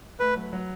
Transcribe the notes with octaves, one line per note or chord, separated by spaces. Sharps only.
A3 B4
F#3
F#3